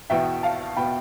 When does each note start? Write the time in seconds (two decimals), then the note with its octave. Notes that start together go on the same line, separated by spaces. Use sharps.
0.10 E2 B2 B3 E5 G5
0.43 F5 A5
0.77 B2 B3 G5 B5